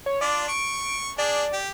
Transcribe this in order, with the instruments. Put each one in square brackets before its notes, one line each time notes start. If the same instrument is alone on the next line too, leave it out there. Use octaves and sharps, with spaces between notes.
[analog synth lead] C#5
[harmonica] D4 F4 [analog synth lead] D5
[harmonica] C#6 [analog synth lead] D7
[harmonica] D4 G#4 [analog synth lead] D5
[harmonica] G4